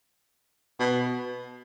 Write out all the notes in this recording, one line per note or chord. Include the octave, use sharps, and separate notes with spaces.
B2